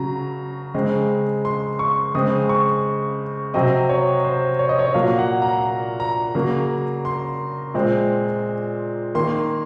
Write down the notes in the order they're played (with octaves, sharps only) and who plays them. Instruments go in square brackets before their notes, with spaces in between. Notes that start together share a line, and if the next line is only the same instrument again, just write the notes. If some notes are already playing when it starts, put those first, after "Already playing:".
Already playing: [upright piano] C#3 F#3 A#5
C#3 G#3 C4
C6
C#6
C#3 G#3 C4 D#6
C#6
C3 F#3 C4 D#5
C#5
C5
C#5
D#5
C#5
A#2 F#3 A#3 F5
F#5
A#5
A#5
C#3 F#3 A#3
C6
A#2 G#3 C4
D#3 A#3 C6